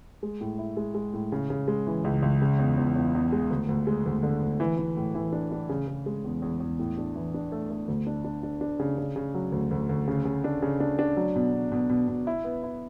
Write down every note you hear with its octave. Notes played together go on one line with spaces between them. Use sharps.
G#3
A2
E4
G#3
G#3
A2
C#3
C#3
G#3
E3
C#2
C#2
C#3
E2
E2
E2
E2
G#3
D2
D2
G#3
D2
D3
D2
E3
E3
A2
E3
D4
D4
C#3
C#3
G#3
E2
E2
E2
A2
D4
E3
D4
A3
A3
D2
D4
D4
D4
D4
C#3
C#3
C#3
F#3
D2
D2
D2
C#3
C#3
D4
C#3
D4
D4
F#3
B2
B2
B2
B2
B2
E4
B3
E4